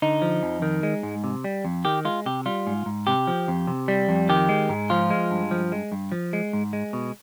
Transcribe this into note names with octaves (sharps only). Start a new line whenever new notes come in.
D3 D#4
F3
F2
D#3
G#3
G#2
C3
G3
F2
D#3 G4
G#3 F4
C3 G4
G3 F4
G#2
G#2
C3 G4
F3
F2
C3
G3
F2
D#3 G4
G#3
G#2
F3 F4
G#3
G2
F3
G#3
G2
F3
G#3
G#2
G#3
B2